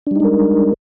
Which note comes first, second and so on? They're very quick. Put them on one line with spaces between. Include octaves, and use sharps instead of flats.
D4 G3 D#4 G#3 A#4